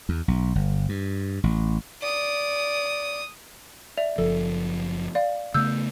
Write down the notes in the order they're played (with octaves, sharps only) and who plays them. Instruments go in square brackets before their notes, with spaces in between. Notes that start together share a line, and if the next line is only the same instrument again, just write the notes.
[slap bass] E2
B1
G1
G2
A1
[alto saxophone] D5 [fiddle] D#6
[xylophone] D5 E5 F7
[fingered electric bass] F#1 F3 [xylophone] A4
[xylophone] D5 F5
[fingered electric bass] C#3 A3 B3 [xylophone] E6 G6